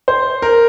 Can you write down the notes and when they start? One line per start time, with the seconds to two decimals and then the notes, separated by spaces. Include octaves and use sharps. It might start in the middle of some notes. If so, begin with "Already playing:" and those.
0.08 C5
0.42 A#4